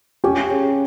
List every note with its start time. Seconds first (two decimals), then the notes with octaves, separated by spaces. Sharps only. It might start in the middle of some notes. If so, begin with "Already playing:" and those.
0.24 C#4 G4
0.50 C#3